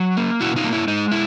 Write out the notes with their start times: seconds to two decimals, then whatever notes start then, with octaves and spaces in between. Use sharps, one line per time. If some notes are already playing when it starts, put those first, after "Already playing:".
Already playing: F#3
0.17 A#3
0.41 B2 E4 F#4
0.56 D#4 F4
0.64 A#3
0.72 E4
0.88 G#3 D#4
1.11 E4